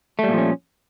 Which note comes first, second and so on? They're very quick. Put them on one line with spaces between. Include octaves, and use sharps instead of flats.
A3 G3 A#2 F3 C#4